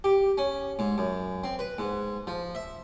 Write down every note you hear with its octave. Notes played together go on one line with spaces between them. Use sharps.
G4
C#4
G#2
F#2
C4
B4
G#2
F3
E5